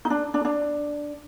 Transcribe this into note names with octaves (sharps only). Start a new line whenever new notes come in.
D#4
D4
D4
D4